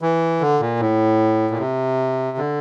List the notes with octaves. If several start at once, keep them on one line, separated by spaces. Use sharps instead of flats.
E3
D3
A#2
A2
A#2
C3
D3